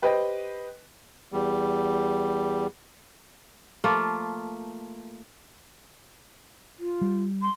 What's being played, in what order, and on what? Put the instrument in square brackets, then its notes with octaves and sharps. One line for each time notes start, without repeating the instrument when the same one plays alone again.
[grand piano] G4 B4 C5 D#5 G5
[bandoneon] E2 G3
[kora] F3 A3 A#3 F4
[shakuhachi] F4
[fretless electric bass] G3
[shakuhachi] C6